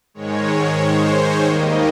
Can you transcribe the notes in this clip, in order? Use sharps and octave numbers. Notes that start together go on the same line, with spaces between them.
G#2 D#3 G#3 C#5
C5
C#5
D#2 D#3 G3 A#3 D#5